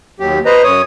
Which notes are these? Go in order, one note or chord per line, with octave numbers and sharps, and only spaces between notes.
D#2 F#3 G4
B4 C5 D#5 A#5
F#2 C#5 D#6